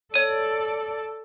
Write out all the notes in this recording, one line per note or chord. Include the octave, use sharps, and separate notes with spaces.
A4 C#5 D5 D#7